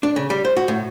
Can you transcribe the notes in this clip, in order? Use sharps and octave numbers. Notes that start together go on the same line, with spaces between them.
D4
C#3
G3
C5
F#4
A2